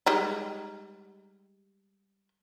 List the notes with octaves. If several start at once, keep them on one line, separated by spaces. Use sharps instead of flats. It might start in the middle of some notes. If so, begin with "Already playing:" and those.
G3 G#3 D#4